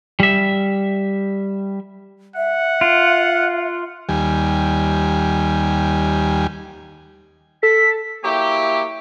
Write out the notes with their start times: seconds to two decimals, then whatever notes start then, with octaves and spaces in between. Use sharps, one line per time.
0.20 G3 E5
2.36 E5 F#5
2.81 F4
4.09 D#2 G3 G#5
7.63 A4 B6
8.24 F#3 A#3 E4 G4